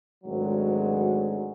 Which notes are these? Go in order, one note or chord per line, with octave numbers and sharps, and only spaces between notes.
G#1 D2 F#3 G#3